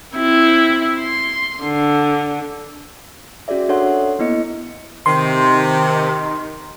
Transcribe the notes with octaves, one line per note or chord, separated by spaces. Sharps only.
C4 E4
C6
D3
C#4 F#4 G#4 D5 E5
D4 A4 C#5 E5 F#5 C6
A#3 B3 E4 D#5 C#7
C3 D#3 C6